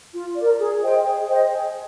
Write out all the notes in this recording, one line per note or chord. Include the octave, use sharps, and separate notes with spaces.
F4
A#4 D5
G#4
C5 D#5 G5
G#4
C5 D#5 G5
G#4